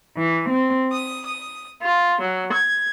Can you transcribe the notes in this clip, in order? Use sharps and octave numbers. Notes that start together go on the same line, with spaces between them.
E3
C4
D#6
D#6
F4
F#3
G#6